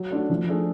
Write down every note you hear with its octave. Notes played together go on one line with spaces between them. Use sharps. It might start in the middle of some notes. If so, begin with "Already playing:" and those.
Already playing: F#3
A3 D4 F#4
F3
A3 D4 G#4